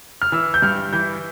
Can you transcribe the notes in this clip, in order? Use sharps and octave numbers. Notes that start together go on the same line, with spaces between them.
F6
E3 E6
G6
G2 F6
E3 G6